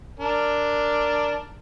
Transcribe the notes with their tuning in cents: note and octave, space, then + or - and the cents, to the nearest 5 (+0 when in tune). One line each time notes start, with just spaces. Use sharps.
D4 +0 A#4 -10